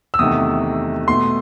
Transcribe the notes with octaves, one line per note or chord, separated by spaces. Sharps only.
E6
E2 C3 D#3 A3 D#6
B2 A3 C6